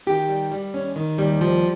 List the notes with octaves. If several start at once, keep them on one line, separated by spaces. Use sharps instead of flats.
D#3 G4
G3
G3
D#2 C#4
D#3
D#2 G3
F3